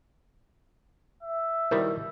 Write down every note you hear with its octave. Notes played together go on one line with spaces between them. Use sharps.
E5
B2 D#3 G3 E4 A#4 C5